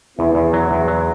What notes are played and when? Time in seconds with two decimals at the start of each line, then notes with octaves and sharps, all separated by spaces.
0.18 E2 B3 E4
0.35 E2
0.53 F#3
0.71 E2
0.88 F#3